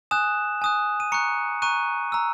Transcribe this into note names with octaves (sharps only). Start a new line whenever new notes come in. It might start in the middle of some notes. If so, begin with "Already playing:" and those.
G#5 D#6 F#6 E7
G#5 D#6 F#6
D#7
A#5 C#6 F#6 C#7
A#5 C#6 F#6 D#7
A#5 E6